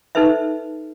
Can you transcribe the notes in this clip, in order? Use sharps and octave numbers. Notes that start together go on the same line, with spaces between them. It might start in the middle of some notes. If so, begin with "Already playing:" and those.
D#4 A4 B4 C5 E5